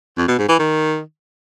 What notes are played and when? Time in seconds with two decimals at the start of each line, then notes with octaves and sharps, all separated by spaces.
0.18 F2
0.28 B2
0.38 G#2
0.49 E3
0.59 D#3